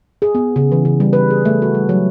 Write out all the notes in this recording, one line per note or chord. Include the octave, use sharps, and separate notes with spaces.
G#4
B3
C#3
E3
C#3
G3
B4
G#4
A3
F#4
G3
F#3